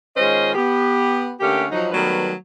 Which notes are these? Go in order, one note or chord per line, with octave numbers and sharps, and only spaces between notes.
D#3 G#3 C#4 F4 C5 D#5
B3 G4
D3 A3 A#3 C#4 G4
F3 F#3 D#4
D#3 F#3 G3 A3 B3 B4